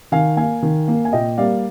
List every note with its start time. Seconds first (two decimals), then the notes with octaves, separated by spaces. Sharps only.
0.12 D#3 F5 G#5
0.36 A#3 F5 G#5
0.62 D#3
0.88 A#3
1.05 G#5
1.13 A#2 D#5 G5
1.38 G3 A#3 D5 F5